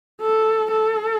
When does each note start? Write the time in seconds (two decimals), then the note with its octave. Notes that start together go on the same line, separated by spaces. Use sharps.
0.21 A4
0.71 A4